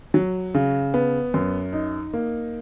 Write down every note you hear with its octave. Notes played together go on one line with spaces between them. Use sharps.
F#3
C#3
B3
F#2
D#4
A#3